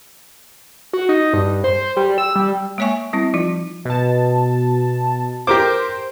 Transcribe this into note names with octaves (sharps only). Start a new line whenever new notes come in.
F#4
D#4
G2
C5
G3
E6
G3
G#3 A#3 C#5 E5 G#5 C#6
G3 C4 E4
F3 D#4 F4
B2 A5
G4 A#4 C5 D6